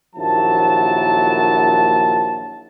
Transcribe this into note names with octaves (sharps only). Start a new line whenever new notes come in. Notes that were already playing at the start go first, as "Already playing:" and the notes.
A#1 D#2 F3 F#3 E4 A5